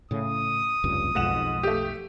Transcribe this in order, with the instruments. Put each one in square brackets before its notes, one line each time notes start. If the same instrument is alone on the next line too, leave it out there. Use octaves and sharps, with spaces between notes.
[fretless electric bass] A2 C#3 [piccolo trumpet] D#6
[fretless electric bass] F1 C#2 G2
[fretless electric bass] B1 F2 [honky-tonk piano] G#2 F#5 E7
[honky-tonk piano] A3 G4